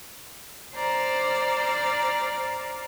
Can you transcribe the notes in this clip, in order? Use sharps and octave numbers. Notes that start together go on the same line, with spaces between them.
C5 D5 A#5 F6